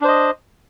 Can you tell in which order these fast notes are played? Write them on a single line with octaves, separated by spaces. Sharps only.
D4 C5 D#5